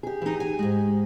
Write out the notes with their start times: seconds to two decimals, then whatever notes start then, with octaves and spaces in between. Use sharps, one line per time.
0.03 G4 G#4
0.22 E3 D#4
0.40 G#5
0.59 G#2 G#3